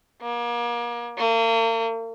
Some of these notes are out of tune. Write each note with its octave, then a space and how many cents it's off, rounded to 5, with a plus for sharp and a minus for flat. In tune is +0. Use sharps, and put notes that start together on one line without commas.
A#3 +35
A#3 -40